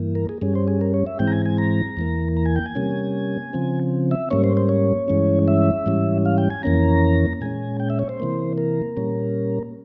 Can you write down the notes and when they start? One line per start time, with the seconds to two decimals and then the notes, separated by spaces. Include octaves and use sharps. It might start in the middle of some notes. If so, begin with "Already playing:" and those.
Already playing: G2 E3 A#3
0.15 A#4
0.29 G#4
0.42 G2 G3 C#4 G#4
0.55 C5
0.68 G#4
0.81 A#4
0.94 C#5
1.06 E5
1.19 G#2 E3 G#3 C4 G5
1.27 A#5
1.32 G#5
1.46 G#5
1.58 A#5
1.97 E2 E3 A#3
2.37 A#5
2.46 G#5
2.56 G5
2.66 G#5
2.75 C3 G3 A#3 C#4
3.53 C#3 F3 C4
4.11 E5
4.31 G#2 G3 A#3 C#4 C#5
4.44 C5
4.57 C5
4.69 C#5
5.08 G2 E3 G#3 C#4
5.48 E5
5.86 G#2 E3 G3 C#4
6.25 F5
6.38 G5
6.50 G#5
6.63 F2 E3 A#3 C#4 A#5
7.41 A#2 G#3 C#4 G#5
7.80 G5
7.90 E5
7.99 C#5
8.09 C5
8.20 C3 E3 A#3
8.58 A#4
8.97 A#2 G3 A#3 C#4